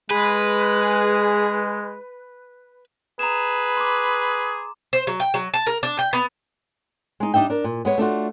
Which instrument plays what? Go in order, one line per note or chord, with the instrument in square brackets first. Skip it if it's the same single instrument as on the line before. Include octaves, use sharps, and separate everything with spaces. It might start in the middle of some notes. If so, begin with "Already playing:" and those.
[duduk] G#3 [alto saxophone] G#4 [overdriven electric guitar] B4
[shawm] G#4 [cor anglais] B4 [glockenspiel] A#5 E7
[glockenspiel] C6 D6
[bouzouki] C5
F#3
G5
F#3
A5
A#4
D4
G5
B3
[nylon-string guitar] G#3 D#4
G3 D4 D#4 E5 G5
D4 A#4
A#2
G#3 B3 C#5
A3 D4 F4 F#4